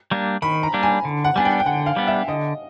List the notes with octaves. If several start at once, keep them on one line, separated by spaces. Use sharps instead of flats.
G3 A#3 D4
D#3 B5
A#5
G3 A#3 D4
G#5
D3
F#5
G3 B3 D4 G#5
G5
G5
D3 F#5
F5
G3 B3 D4
E5
D3 D#5